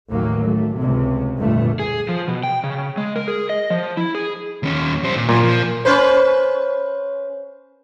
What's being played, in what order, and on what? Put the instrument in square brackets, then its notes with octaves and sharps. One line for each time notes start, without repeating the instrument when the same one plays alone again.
[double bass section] A1 D#2 F#3 A#3
A3
C#2 C3
G1 F2 A#2 A3
[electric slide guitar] G#4
F3
B2
G5
C#3
G#3
A#4
G#4
D#5
F3
E4
G#4
[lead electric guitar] D#2 C#4
G3 C5
A#2
[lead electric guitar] F#2 F4 [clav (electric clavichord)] A#2
[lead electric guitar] F3
[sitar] C#4 B4 C5